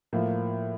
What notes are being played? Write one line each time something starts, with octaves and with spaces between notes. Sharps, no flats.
A2 F3 A#3 F4